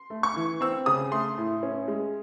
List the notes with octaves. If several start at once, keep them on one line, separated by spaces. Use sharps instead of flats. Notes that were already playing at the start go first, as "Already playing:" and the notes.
Already playing: C6
A3
C#6
E3
C4 E6
C#3 D#6
A3 C6
A2
C#4
G#3